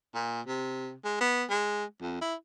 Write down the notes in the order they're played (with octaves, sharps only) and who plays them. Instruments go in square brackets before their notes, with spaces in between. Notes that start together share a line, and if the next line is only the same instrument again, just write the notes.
[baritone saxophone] A#2
C3
G#3
B3
G#3
F2
E4